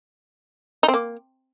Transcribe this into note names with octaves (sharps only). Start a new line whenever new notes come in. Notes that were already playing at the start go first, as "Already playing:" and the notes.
D#4
C4
A#3